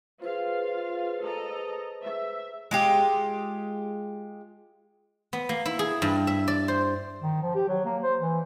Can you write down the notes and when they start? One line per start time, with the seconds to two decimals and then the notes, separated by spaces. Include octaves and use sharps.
0.22 F4 G#4 B4 C5 F5
1.24 A4 D#5 A#5
2.05 E5
2.71 G#3 F4 G4
5.33 B3
5.49 A#3
5.66 E4
5.79 G#4
6.02 G2
6.27 E5
6.48 D5
6.68 C5
7.22 D#3
7.42 F3
7.55 G4
7.68 F#3
7.85 A#3
8.03 C5
8.20 E3